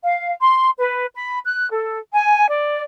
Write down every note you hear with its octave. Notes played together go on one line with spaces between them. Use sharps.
F5
C6
B4
B5
F#6
A4
G#5
D5